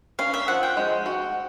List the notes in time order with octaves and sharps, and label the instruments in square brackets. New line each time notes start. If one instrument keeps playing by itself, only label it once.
[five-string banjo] C#4 [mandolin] F5
[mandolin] E5
[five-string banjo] F3 [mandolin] F#5
[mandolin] G5
[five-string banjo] G#3
F#4